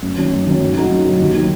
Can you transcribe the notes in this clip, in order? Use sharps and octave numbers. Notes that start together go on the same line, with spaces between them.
F#2
D#3 F#3 C#4
F#2
D#3 F#3 C#4
F#2
F#3 D#4 F#4
F#2
F#3 D#4 F#4
D#2
D#3 F#3